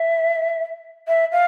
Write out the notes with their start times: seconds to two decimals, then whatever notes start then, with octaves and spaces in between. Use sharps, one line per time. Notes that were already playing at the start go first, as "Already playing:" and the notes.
Already playing: E5
1.08 E5
1.32 F5